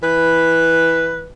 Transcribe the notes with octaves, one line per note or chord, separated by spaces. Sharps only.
E3 B4